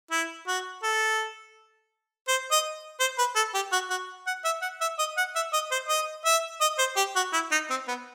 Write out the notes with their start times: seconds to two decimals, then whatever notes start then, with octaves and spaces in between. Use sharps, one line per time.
0.11 E4
0.47 F#4
0.83 A4
2.28 C5
2.51 D#5
3.00 C5
3.18 B4
3.36 A4
3.54 G4
3.72 F#4
3.90 F#4
4.27 F#5
4.45 E5
4.62 F#5
4.81 E5
4.98 D#5
5.17 F#5
5.35 E5
5.53 D#5
5.71 C5
5.88 D#5
6.25 E5
6.61 D#5
6.78 C5
6.97 G4
7.16 F#4
7.33 E4
7.51 D#4
7.70 C4
7.88 B3